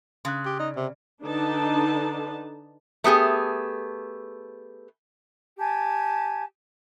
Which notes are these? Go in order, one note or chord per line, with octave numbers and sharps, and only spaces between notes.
C#3 C6 D#6 F#6
G4
D#4 D5
C3
D3 D4 D#4 B4 A5
A3 B3 G4 G#4
G4 G#5 A5 G#6